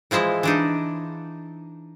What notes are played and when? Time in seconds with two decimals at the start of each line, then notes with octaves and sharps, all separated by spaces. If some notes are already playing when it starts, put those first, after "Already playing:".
0.11 E3 F3 G#3 E4
0.43 E3 D4 D#4